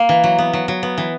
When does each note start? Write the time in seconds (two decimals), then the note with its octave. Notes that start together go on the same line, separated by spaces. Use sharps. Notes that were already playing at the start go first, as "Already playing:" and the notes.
Already playing: A#3
0.09 E3
0.24 F#3
0.39 B3
0.53 F#3
0.68 F#3
0.83 B3
0.98 E3